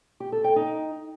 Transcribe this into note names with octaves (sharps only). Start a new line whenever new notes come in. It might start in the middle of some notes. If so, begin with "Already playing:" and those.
G4
A4
G5
D#4